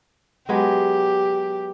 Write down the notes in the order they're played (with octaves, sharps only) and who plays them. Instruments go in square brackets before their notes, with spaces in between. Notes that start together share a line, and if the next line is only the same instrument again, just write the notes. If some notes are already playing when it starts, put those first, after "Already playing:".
[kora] F#3 G#3 B3 [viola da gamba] G4